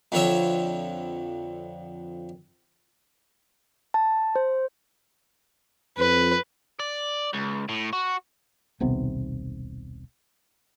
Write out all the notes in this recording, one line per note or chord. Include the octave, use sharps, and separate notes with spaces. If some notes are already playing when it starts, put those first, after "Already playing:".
F2 D3 C#5 E5
A5
C5
F2 B4
D5
C#2
A2
F#4
D#1 B1 C3 B3